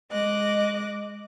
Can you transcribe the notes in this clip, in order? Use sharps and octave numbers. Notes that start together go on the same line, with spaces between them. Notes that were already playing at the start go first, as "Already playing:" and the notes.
G#3 D#5 D6 F#6 A#6